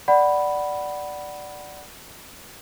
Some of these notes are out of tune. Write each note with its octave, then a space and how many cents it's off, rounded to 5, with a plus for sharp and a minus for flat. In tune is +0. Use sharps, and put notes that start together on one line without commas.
D5 +0 F#5 +15 B5 +0